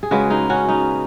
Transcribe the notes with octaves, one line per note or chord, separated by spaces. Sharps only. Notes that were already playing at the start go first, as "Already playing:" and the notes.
G#4
C#3 G#3 F#4 B4
D#4 G#4
C#4 F#4
B3 D#4